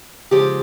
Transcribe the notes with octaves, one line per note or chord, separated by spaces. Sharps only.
C#3 F3 G#3 G4